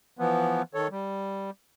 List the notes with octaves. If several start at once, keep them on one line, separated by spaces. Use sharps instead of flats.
E3 F3 B3
D#3 A4 C#5
G3